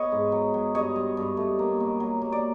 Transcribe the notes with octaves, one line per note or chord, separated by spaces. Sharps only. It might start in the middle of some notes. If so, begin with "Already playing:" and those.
Already playing: B3 C#5 D#5
G#2
F#3
F#3
G2 C#5 D#5
G2
G2
A3
A#3
B2
F#3
A#3
D5